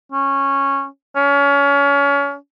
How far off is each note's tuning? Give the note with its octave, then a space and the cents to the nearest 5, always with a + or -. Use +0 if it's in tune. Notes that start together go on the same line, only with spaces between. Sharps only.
C#4 -10
C#4 +30